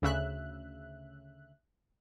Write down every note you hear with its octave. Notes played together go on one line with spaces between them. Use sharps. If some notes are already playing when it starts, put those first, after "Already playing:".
D2 C#3 E5 F#6